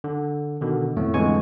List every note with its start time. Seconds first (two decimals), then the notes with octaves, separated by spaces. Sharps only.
0.04 D3
0.61 B2 D3 D#3
0.96 F2 A2 A3 B3
1.14 F2 D3 E3 G#3 G#5 C#6